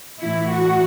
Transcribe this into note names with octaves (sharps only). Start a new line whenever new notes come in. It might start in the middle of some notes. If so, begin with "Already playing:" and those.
A2 E3 E4
F#4